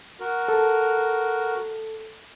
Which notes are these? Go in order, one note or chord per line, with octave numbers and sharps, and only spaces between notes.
F#4 A#4
A4